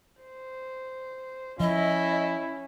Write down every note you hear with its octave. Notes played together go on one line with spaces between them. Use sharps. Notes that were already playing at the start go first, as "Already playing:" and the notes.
C5
F3 C#4 E4 D#5